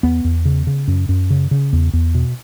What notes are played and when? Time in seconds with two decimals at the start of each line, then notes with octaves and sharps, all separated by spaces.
0.03 E2 B3
0.24 E2
0.45 C#3
0.67 C#3
0.88 F#2
1.09 F#2
1.30 C#3
1.51 C#3
1.73 E2
1.93 E2
2.15 B2